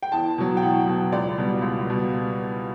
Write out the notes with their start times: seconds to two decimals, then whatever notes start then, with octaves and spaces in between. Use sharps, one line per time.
0.03 G5
0.12 E2 A5
0.38 B2 F#3
0.57 G5
0.62 E2 F#5
0.87 B2 F#3
1.12 C#2 D5
1.38 B2 G3
1.62 C#2
1.87 B2 G3